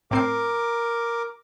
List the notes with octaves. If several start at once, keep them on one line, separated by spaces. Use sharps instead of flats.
A2 C4 A#4 D6 C7